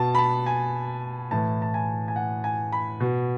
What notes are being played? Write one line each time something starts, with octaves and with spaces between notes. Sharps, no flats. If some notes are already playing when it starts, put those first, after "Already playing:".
Already playing: B2 A5
B5
A5
G#5
A2 E3 A5
A5
G#5
G#5
F#5
G#5
B5
B2